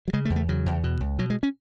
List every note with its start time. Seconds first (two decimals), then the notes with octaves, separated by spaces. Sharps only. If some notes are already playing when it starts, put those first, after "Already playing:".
0.08 F#3
0.13 C#3 G#3
0.25 A3
0.30 E2
0.36 A3
0.49 C#3 F#3
0.66 E2
0.84 B2
1.01 C#2
1.19 B2 F#3
1.30 G#3
1.43 C#4